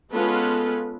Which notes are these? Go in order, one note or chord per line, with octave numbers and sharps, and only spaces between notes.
G#3 B3 C#4 F4 A4 B4